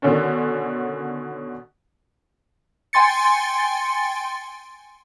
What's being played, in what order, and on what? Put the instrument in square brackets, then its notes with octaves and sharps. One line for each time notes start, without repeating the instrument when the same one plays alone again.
[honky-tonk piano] B2 D3 D#3 C#4 D4
[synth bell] G5 G#5 C6 A6 C#7